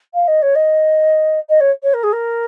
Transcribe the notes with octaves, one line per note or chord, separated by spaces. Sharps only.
F5
D#5
C#5
D#5
D#5
C#5
C#5
A#4
G#4
A#4